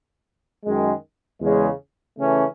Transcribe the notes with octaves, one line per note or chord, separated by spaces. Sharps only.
F#2 D#3 G#3
E2 C#3 G#3
C#3 E3 A3 C#4